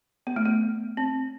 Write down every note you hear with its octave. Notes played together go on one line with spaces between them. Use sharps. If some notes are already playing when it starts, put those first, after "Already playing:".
B3
A3
B3
C4